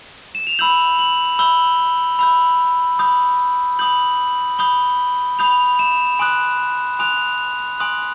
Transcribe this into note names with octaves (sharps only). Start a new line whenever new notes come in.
E7
F7
B5 E6 G6 F#7
F#7
B5 E6 G6 G7
B5 E6 G6
B5 D#6 G6
B5 D#6 G6 F#7
B5 D#6 G6 G7
B5 D#6 G6 F7
E7
G#5 C6 D#6 F#6
G#5 C6 D#6 F#6 F7
G#5 C6 D#6 F#6